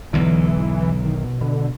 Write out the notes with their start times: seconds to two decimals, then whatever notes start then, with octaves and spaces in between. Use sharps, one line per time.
0.13 B1 E2 D3 E3 F#3
1.04 D#3
1.24 B2
1.41 B2 D3